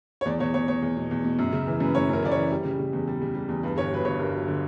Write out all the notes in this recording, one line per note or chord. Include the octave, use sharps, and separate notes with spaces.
C#5
E2 D5
E2 C#5
E2 C#5
E2 C#5
E2
B2
E2
B2
F#2
C#3
E3
F#2 B4
F#2 C#5
F#2 A#4
C#3 D5
C#5
E3
G3
C#3
C#3
E2
G3
C#3
G3
E2
G2 B4
G1 C#5
F#3 B4
G1 C#5
G2 A#4
F#3
D3